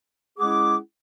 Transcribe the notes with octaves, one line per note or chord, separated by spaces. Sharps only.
G#3 C#4 E4 G#4 F#5 D6